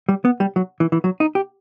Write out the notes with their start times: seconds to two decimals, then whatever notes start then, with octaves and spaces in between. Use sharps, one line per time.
0.09 G3
0.25 B3
0.40 G3
0.56 F#3
0.80 E3
0.92 E3
1.04 F#3
1.20 D#4
1.35 G4